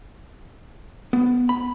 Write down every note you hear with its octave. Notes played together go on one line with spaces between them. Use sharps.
B3
B5